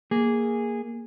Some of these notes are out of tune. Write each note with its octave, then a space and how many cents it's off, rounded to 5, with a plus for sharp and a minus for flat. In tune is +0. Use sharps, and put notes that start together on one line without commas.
A#3 +0 G#4 -10